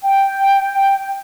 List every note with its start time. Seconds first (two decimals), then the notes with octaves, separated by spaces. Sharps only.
0.02 G5